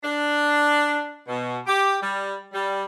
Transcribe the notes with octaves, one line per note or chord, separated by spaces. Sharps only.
D4
B2
G4
G3
G3